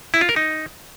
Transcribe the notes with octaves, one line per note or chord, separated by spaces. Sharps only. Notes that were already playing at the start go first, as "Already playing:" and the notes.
E4
F4
A#4
D#4